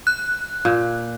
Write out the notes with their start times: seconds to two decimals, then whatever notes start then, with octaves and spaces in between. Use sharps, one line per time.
0.07 F#6
0.65 A#2